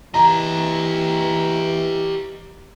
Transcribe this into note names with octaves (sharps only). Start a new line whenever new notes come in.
E3 G4 D#5 A#5